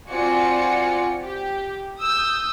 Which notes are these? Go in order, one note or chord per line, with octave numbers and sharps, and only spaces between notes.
C4 F4 F#4 D5 G#5 C#7
G4
D#6 E6 G6